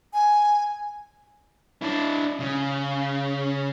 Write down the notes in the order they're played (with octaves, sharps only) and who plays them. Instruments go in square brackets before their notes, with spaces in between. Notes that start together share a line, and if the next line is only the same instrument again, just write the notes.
[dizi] G#5
[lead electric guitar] D4 E4
C#3